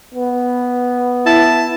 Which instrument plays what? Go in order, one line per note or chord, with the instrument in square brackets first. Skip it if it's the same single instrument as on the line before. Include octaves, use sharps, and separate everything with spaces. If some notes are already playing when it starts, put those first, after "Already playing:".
[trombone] B3
[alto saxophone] E4 [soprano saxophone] A5